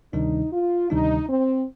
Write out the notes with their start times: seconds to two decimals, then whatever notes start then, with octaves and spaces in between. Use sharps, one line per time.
0.13 D2 C3 D#3 G3 D4 D#4
0.52 F4
0.90 D2 C3 D#3 G3 D4 D#4
1.29 C4